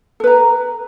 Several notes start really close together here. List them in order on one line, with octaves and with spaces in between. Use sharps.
A4 B4 A#5